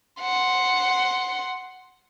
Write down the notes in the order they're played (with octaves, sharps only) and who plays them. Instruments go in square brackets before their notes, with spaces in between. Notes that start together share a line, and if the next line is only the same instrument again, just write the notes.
[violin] F#5 C6